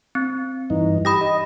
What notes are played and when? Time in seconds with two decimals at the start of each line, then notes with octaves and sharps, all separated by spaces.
0.15 C4
0.70 G2 E3 D#4
1.05 G4 B5 D#6 A#6
1.21 D#5